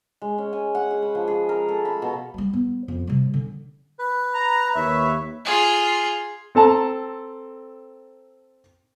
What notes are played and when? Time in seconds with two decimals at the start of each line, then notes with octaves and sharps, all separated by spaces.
0.22 G#3
0.38 C#4
0.53 G#5
0.75 F#5
0.91 G#4
1.02 B4
1.15 F3
1.28 G#4
1.49 A#4
1.68 A4
1.85 B5
2.02 B2
2.34 F#3 G3
2.53 B3
2.88 F2
3.07 C3 G3
3.34 D3 C#4
3.99 B4
4.34 A#5
4.75 D#2 C#5 E5
5.45 F4 G#4
6.55 C4 A4 A5 A#5